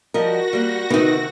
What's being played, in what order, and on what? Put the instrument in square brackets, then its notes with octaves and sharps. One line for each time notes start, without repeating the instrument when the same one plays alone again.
[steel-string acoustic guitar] F3 G3 D#5 [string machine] F#4 A#6 [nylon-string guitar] A#4
[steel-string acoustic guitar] G3 A#3
[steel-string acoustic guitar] D2 C3 D#3 [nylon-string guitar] B3 D#4